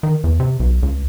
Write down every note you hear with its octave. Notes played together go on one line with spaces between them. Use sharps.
D#3
E2
C3
B1
C#2